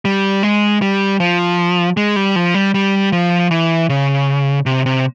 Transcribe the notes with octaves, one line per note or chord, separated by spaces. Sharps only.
G3
G#3
G3
F3
G#3
G3
F3
G3
G3
F3
E3
C#3
C3
C3